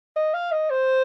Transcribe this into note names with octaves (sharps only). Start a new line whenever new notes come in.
D#5
F5
D#5
C5